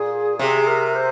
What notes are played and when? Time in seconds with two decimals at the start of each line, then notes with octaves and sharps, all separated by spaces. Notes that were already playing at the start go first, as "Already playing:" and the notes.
Already playing: A#2 G#4
0.39 C3 G#4
0.67 A#4
0.95 C5